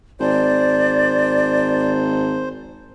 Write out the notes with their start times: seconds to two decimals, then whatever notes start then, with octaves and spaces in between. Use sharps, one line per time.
0.20 G#1 C5 D5